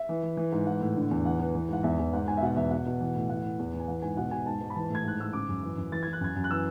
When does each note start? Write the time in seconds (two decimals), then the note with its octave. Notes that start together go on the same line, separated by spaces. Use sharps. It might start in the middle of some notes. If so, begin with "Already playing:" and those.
Already playing: E5
0.09 E3
0.23 E3
0.37 E3
0.52 G#2
0.67 E3 F#5
0.81 A2
0.96 D3
1.11 E2
1.25 E3 F#5
1.39 E3
1.55 E3
1.68 G#2 F#5
1.83 E2 E5
1.98 E2
2.13 G#2 F#5
2.27 G#2 G#5
2.37 E5
2.42 B2 F#5
2.56 E2 E5
2.71 B2 F#5
2.86 B2
3.01 E3
3.15 A2
3.29 E3 F#5
3.44 E3
3.59 E2
3.73 E3
3.80 G#5
3.88 E3 F#5
4.02 G#2 G#5
4.17 B2 F#5
4.31 B2 G#5
4.46 G#2 A5
4.61 G#2
4.70 B5
4.75 E3 A5
4.90 A2 G#6
5.04 G#2 F#6
5.20 G#2 E6
5.33 C#3 D6
5.49 F#2
5.63 E3
5.78 F#2
5.92 E3 A6
6.03 E3 G#6
6.13 F#6
6.21 F#2 G#6
6.36 F#2
6.44 F#6
6.51 E3 E6